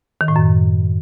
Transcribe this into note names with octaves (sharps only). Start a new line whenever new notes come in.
D#3
A2
F#2